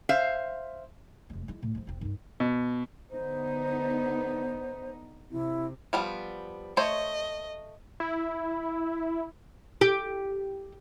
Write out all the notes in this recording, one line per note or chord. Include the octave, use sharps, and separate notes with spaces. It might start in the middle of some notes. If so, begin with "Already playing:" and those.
C5 E5 F5
F1 G#3
G#3 E4
A2
F3 G#3
E1 C4
G2 D#3
B2
D3 B3 D#4 C5
C3 E4
F3 G3 B3
A3 C5 C#5 D#5
E4
G4